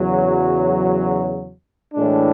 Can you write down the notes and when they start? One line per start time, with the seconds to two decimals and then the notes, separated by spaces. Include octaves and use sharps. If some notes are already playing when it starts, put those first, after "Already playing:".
Already playing: E2 C#3 F#3
1.94 A2 E3 G#3 D4